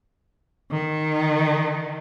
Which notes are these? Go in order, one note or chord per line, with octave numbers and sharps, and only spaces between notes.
D#3